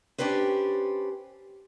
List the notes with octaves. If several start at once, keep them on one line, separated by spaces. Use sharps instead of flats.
C#4 D4 G4 B4 C5